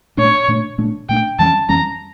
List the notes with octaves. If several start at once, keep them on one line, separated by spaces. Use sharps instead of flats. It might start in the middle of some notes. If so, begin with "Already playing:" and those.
A#2 A3 D4 C#5
A#2 A3 D4
A#2 A3 D4
A#2 A3 D4 G5
F2 E3 G3 C#4 A5
F2 E3 G3 C#4 A#5